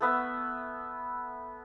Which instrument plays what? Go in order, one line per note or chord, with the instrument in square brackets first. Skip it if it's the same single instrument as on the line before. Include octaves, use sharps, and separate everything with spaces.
[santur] A3 B3 E5